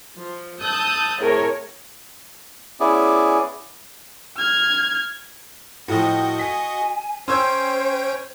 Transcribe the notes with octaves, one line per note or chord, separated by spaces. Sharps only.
F3
A5 D#6 E6 F#6 G6
A2 C3 G#4 A#4 C#5
B3 C#4 E4 G#4 D5
F6 G#6
A2 F3 F#4 D#5 G5
G#5 B6
C#4 C5 C#5 G5 C6 E6 G#6